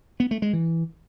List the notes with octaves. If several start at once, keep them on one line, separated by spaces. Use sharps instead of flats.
B3
A3
G#3
E3